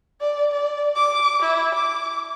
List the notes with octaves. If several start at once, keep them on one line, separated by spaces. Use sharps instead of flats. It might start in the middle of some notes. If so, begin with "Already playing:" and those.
D5
D5
D6
E4
D6